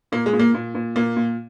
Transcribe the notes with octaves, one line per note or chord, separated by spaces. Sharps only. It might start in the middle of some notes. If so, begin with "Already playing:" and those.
A#2 A#3
G#3
A#2
A#3
A#2
A#2
A#2 A#3
A#2